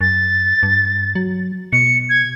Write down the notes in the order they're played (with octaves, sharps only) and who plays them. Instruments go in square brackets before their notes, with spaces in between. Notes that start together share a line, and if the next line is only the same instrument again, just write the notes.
[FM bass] F#2 [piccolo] A6
[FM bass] G2
F#3
[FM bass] B2 [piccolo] C#7
[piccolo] G#6